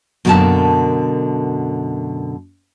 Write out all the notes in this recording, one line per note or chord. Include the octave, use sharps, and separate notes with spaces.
F#2 B2 D3 A#3 A4 A5